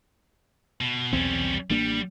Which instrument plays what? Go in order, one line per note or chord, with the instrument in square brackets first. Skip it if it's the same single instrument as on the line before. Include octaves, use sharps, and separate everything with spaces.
[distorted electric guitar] B2
[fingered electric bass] B1 E2 C4 [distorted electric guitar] G3 C#4
[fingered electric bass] A1 A#3 D4 [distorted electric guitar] G3